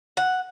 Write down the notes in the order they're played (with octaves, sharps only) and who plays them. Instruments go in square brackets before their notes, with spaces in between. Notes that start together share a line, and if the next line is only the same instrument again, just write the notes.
[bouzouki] F#5